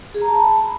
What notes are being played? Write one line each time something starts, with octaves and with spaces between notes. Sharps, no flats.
G#4
A#5
A5
B5